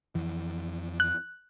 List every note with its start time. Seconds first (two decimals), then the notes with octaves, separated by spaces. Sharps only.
0.15 F2 E3
1.00 F#6